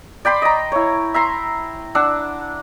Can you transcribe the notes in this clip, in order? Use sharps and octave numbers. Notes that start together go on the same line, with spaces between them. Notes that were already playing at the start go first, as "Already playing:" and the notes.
D5 G5 B5 C6
D#5 A#5
E4 C#5
E5 A#5 C6
D4 F#5 E6